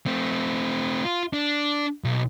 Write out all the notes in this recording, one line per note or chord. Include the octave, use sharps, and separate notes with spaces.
A3 C4
F4
D4
B1